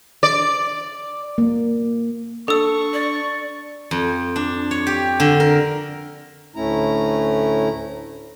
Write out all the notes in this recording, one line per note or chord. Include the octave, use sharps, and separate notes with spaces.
D5
A#3
D4 A4 C#6 E6
D5
F2
D4
C#5
G4
D3
A#4
D2 A2 A3 C#4 E4 A#5